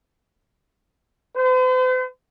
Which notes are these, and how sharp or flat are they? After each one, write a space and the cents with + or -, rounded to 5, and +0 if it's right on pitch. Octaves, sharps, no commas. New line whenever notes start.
C5 -45